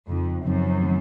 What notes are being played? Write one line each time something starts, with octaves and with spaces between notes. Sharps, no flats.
F2 C#3 F3 C4 D#4
F#2 C#3 F3 C4 D#4
D#3 A3 C4